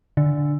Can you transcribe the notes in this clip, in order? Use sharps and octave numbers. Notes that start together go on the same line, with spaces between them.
D3